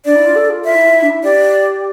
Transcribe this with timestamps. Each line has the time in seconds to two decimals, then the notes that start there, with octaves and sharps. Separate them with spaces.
0.05 D4 D5
0.15 E4
0.25 F4
0.35 A4
0.50 F4
0.64 F4 E5
0.74 E4
0.85 F4
0.93 E4
1.02 D4
1.10 E4
1.23 G4 D5